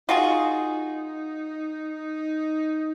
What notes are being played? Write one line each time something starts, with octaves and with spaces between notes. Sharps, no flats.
D#4 F4 F#4 G#4